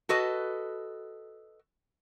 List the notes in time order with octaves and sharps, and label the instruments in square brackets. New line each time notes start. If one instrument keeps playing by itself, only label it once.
[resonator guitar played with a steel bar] F#4 A4 B4 D#5